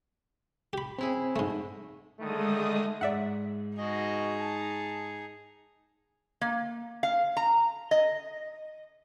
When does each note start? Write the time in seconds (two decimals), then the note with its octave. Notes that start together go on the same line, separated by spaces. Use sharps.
0.73 G4 B5
0.98 C#3 C4 E4 G#4
1.36 G#2 B2 A3
2.19 D3 D#3 G#3 A3 D#6
3.01 G#2 D5 E5 F#5
3.78 D#4 F#4 G#4 D#5
4.40 A5
6.41 A#3
7.03 F5
7.37 A#5
7.91 D#5